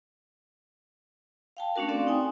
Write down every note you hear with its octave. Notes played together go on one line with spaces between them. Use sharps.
F5 G5 A5
A3 C#4 D4 F#4 A#4
C4 A4 D5 F5
C4 D#4 G5 G#5 D#6